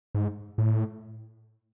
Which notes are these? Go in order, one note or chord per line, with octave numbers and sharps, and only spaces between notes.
G#2
A2